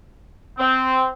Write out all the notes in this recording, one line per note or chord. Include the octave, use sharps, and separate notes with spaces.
C4